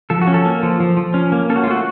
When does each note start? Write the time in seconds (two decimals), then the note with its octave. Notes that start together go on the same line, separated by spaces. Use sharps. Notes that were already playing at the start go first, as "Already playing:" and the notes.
0.10 F3 A4
0.22 F#4
0.27 C#4
0.34 A4
0.45 A#3
0.63 F3
0.80 F3
0.97 F3
1.14 C#4
1.32 A#3
1.49 C#4 A4
1.56 F#4
1.64 F4
1.67 A3 F#4